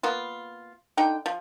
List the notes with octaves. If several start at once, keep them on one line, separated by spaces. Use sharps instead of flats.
A#3 B3 F4
D3 D#4 G5
F3